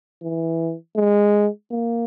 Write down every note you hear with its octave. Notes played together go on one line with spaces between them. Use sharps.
E3
G#3
A#3